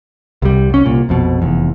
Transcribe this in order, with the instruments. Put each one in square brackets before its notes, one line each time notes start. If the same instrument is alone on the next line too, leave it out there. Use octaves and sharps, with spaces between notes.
[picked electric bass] C2 G3
C2 C#4
C2 A#2
A#1 F2 B2
F1 E2